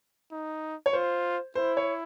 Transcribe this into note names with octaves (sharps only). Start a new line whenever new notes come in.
D#4
C#5
F4 C5
E4 C5
C#5